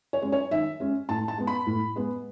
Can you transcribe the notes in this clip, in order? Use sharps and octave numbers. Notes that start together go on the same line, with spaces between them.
C#5
G#3 C#4
C#5
D#3 E5
G#3 C#4
A2 A5
A5
G#3 B3
B5
A2
G#3 B3